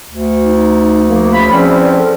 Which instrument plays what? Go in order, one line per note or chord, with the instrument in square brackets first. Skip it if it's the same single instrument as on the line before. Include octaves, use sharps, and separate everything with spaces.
[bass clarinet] D2
[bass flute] D#4
[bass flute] F3 [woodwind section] A#3
[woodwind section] C#3 F4 B5
[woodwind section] E2 C4 C#4 [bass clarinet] F3 [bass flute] D5
[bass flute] A4